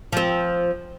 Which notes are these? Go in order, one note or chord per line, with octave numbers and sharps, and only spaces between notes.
F3 C4